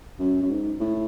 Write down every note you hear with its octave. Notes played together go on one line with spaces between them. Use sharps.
F#2
F#2
G#2
A2